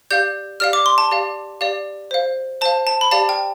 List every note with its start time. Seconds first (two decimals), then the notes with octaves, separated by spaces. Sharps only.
0.11 G4 D5 F5 G6
0.60 G4 D5 F5 F6
0.73 D6
0.86 C6
0.98 A5
1.11 G4 D5 F5
1.61 G4 D5 F5
2.11 C5 F5
2.61 C5 A5
2.65 F5
2.87 A5
3.01 B5
3.11 G4 D5 F5 A5
3.29 G5